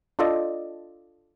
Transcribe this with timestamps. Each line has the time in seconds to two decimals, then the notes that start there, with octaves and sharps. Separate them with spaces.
0.19 D4 F4 A4 D5 D#5